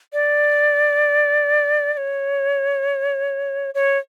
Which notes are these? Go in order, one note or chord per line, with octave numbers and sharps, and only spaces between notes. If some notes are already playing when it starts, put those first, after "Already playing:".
D5
D5
C#5
C#5